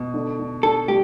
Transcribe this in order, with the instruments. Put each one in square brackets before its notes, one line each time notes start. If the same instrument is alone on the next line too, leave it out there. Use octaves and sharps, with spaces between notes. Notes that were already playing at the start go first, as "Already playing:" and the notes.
Already playing: [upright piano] B2
D3
D3
[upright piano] D3 [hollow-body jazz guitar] A4
[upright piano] G3 [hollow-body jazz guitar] G4